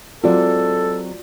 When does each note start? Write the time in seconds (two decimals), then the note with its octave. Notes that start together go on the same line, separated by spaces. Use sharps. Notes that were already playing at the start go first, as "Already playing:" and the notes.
0.24 F#3 G#3 C4 F4 F#4 A4 D5